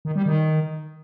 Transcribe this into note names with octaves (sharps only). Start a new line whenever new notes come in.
D#3
G3
D#3